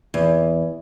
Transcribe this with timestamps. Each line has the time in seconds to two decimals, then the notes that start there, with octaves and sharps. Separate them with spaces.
0.14 E2